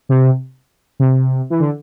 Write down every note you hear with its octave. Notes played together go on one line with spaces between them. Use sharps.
C3
C3
E3
D3